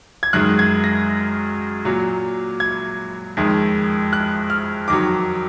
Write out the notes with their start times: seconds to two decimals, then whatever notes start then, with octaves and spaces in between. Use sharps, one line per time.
0.23 G#6
0.33 F#2 D#3 G#3 F#6
0.59 G#6
0.84 A#6
1.85 A#2 F#3
2.60 G#6
3.37 F2 D#3 G#3
4.13 F#6
4.50 F6
4.88 F2 D#3 F#3 D6